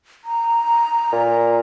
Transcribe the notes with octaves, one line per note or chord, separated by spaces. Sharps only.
A#5
A#2